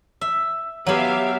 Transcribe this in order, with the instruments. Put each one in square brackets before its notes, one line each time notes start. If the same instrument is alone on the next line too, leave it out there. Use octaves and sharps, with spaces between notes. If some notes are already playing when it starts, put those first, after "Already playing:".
[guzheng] E5
[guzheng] F#3 B3 [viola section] G4 E5 F5